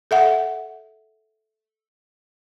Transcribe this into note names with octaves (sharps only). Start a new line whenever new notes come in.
A4 E5 F#5